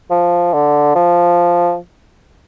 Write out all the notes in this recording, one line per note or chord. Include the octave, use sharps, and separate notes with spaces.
F3
D3
F3